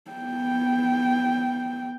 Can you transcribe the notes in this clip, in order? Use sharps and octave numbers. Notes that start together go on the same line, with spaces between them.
B3 G5